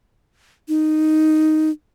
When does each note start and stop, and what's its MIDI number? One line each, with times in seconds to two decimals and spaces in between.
0.68 1.70 63